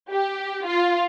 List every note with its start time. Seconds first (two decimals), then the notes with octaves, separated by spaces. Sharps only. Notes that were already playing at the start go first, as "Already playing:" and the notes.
0.11 G4
0.67 F4